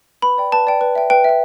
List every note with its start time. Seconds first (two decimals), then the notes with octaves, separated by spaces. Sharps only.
0.22 B4 B5
0.38 D5 G5
0.52 B4 A5
0.67 D5 G5
0.81 B4
0.95 E5 G5
1.10 B4 G5
1.24 E5 G5